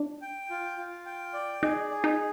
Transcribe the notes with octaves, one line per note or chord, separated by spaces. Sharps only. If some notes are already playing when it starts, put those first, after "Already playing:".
Already playing: D4
G5
F4
F4
G5
D5
D#4 G#4
G#4
D#4